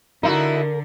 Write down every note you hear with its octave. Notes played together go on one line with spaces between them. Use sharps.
D3 D#4 E4 F#4 A#4